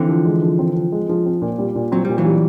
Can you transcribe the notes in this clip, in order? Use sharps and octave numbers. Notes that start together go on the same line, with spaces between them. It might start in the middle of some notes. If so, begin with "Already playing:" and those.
Already playing: D3 E3 C4
F3
G#3
F3
C4
F3
G#3
F3
C4
A#2
G3
A#2
F#3 C4
A#2 G3
E3 F#3
G3